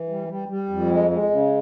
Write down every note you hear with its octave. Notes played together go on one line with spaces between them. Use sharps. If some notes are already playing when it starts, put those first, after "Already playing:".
Already playing: E3
G3
G3
G3
F2
G#3
G#3
C#3